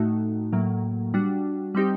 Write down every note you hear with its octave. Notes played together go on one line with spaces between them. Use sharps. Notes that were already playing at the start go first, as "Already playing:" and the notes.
Already playing: A2 A3 D#4 F#4
A2 F#3 A#3
G3 D4 F#4
G3 C4 D#4 G4